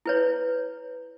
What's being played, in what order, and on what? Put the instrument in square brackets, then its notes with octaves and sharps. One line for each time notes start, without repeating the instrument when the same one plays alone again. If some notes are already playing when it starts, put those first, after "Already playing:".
[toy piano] E4 B4 C#5